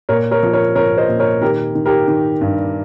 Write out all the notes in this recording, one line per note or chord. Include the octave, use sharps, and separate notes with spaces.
A#2 A#4 C#5
A#4 C#5
F3
A#4 C#5
F3 A#4 C#5
C5 D#5
A#2
A#4 C#5
D#3 G4 A#4
D#3
G4 A#4
D#3
G2